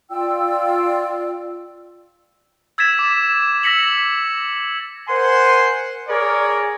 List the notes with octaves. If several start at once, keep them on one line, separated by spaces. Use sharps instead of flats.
F4 D5 G5 E6
E6 G#6 A6 B6 E7
D6
E6 A#6 B6 C#7 F#7
A#4 C5 F#5 G#5 C6
G#4 A#4 C#5 D5